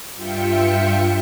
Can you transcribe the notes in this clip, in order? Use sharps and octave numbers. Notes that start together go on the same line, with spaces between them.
G2 F4 E5 G5 C#7